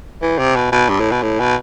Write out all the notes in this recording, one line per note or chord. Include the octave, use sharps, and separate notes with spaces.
E3
C3
B2
B2
G2
A2
B2
A2
B2